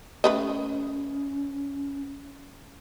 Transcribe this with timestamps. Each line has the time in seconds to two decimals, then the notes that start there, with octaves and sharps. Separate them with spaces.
0.24 A3 C#4 B4 D#5